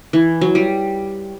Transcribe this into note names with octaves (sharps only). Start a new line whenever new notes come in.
E3
F#3
G3